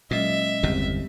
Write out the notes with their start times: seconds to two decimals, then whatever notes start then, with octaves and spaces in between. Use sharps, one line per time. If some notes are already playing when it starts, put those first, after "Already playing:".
0.11 A#2 F#3 G#3 C#4 D#5 E5
0.63 G1 E2 C#3 C4 G4